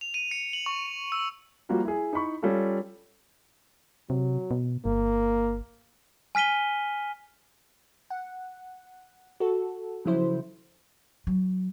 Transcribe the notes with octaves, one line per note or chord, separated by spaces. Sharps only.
F7
D#7
C#7
F#7
C#6
E6
F3 G3 A#3 F4 F#4 A#4
E4 G#4
D#4 E4 B5 C#6
G3 C#4 F4 A4
C3 F#3
B2
G1 A#3
G#5 F6 B6 D#7 G7
F#5
F#4 A4
C#3 F3 F#3 E4 C5
F#3